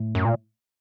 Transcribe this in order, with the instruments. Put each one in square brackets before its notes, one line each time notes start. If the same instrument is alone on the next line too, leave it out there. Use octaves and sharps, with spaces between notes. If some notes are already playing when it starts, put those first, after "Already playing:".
Already playing: [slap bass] A2
[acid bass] F#2
A#2